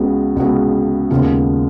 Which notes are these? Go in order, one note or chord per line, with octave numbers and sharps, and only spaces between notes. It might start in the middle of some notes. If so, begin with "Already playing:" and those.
Already playing: C#2 C#3 G#3 B3 F#4
C#2 C#3 G#3 B3 F#4
D#2 C#3 G#3 B3 F4